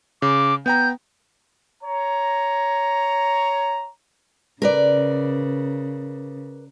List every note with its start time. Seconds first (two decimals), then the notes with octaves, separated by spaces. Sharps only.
0.22 C#3 D6
0.66 B3 G5 A#5 G6
1.82 C#5 A#5
4.62 C#3 A#4 B4 D5